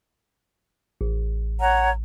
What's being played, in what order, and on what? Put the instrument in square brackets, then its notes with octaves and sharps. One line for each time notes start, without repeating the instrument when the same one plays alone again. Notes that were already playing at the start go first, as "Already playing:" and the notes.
[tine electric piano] A1
[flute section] C#5 F#5 A#5